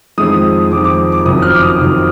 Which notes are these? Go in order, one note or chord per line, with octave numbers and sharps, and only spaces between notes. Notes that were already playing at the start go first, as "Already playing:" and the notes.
F2 D#3 G#3 D#6
F2 D#3 G#3 D6
D6
D6
F#1 F2 D#3 F#3 D#6
F6
D6
D#6
F#1 F2 D#3 F#3